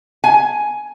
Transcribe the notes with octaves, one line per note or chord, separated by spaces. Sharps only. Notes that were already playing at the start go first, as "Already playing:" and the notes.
G#5